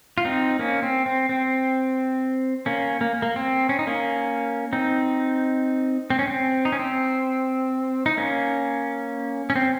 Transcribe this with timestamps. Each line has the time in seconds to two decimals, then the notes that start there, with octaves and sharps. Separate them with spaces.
0.18 F4
0.25 C4 D#4
0.59 A#3 C#4
0.83 C4
1.06 C4
1.29 C4
2.66 A#3 C#4
3.01 A#3
3.22 A#3
3.36 C4
3.69 C#4
3.79 D#4
3.87 A#3 C#4
4.73 C4 D#4
6.10 C4
6.19 C#4
6.28 C4
6.65 D#4
6.72 C#4
6.79 C4
8.06 D#4
8.17 A#3 C#4
9.50 C#4
9.56 C4